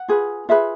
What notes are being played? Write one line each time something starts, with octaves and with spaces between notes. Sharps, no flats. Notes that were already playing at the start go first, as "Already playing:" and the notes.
Already playing: F#5
F4 G#4 B4
F4 G#4 B4 E5